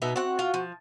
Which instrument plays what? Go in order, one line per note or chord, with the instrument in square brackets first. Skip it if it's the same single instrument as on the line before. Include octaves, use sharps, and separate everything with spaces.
[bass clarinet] B2 [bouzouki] B3 D#4 E5
[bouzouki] C4 F#5 [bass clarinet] F#4
[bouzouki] F4
F3